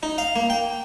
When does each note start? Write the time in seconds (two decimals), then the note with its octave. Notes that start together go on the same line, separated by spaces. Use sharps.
0.03 D#4
0.18 F5
0.36 A#3
0.50 G5